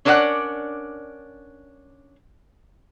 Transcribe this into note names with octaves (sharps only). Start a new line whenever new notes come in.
C#4 D4 A#4 D5 E5 F#5